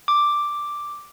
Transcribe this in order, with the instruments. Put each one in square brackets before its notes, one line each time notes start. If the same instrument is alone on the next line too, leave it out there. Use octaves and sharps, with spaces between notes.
[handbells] D6